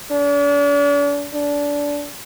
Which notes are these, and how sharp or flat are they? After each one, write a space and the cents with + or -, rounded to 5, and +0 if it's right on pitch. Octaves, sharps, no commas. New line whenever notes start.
D4 -40
D4 -20